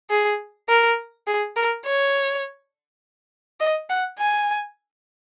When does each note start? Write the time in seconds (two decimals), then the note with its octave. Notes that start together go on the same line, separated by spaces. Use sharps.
0.10 G#4
0.69 A#4
1.28 G#4
1.56 A#4
1.86 C#5
3.60 D#5
3.90 F#5
4.18 G#5